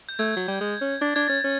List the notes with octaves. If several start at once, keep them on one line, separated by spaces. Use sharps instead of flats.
G6
A3 G#6
F#3
G3
G#3
C#4
D4 A6
D4 G#6
C#4 A6
C#4